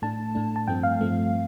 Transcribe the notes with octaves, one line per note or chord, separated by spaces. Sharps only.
A2 A3 D4 A5
A2 A3 D4
A5
G2 F3 A3 C4 G5
F5
G2 F3 A3 C4